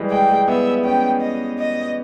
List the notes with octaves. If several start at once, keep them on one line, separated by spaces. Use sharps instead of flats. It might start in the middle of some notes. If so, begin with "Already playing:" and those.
Already playing: E3 G3 G#3
G#3 G5
G#3
B3 E5
C#4 G5
D#5
D#5